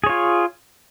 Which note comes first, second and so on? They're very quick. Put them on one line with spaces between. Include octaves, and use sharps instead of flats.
G#4 C#5 F4